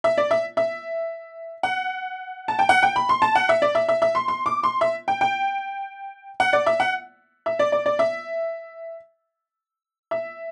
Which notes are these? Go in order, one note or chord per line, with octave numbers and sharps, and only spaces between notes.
E5
D5
E5
E5
F#5
A5
G5
F#5
G5
B5
C6
A5
F#5
E5
D5
E5
E5
E5
C6
C6
D6
C6
E5
G5
G5
F#5
D5
E5
F#5
E5
D5
D5
D5
E5
E5